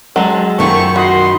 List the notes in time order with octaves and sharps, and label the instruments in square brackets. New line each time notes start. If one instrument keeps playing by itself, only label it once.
[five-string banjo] F#3 G#3 [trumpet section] C4 C#4 A4
[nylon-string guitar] F#2 D#3 F4 [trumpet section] A3 C4 C#6
[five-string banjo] F#4 [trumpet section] D#5 B5 C6